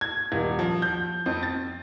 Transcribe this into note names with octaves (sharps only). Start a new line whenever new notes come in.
G#6
D#1
F3
G6
F2
A6